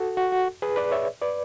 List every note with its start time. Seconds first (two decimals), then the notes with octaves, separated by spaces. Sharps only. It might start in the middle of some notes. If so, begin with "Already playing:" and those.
Already playing: F#4 A4
0.17 F#4
0.32 F#4
0.62 G#4 B4
0.76 B4 D5
0.91 C#5 E5
1.22 B4 D5